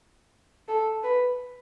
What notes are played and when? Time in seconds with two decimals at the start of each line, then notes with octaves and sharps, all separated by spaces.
0.68 A4
1.04 B4